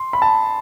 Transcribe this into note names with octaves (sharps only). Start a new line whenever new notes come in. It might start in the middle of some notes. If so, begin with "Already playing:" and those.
Already playing: C6
B5
A5